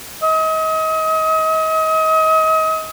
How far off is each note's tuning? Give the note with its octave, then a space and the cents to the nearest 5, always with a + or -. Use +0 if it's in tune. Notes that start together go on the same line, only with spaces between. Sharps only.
D#5 +35